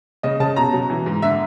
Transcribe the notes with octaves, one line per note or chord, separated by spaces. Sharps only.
C#3 D#5
C#3 A5
B2 A#5
F#3
E3
G#2
D3 E5